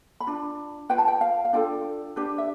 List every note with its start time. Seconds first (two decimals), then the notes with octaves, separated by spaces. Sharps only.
0.20 B5
0.27 D4 F4
0.89 F4 B4 G5
0.98 A5
1.08 G5
1.21 F5
1.45 F5
1.53 D4 F4 A4 G5
2.16 D4 G4 B4
2.38 E5